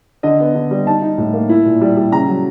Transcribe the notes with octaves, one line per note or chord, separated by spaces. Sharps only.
D3 D#5
B3
D3
G3
D#4 A5
D#4
A2
A#3
E4
A#2
G3
G3
C#3 A#5
F#3